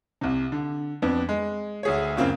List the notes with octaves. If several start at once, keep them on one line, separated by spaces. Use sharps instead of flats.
C2 C3
D3
F2 B3 D4
G#3
D2 G#4 C#5
F#2 C#3 A#3 C4 F4 F#4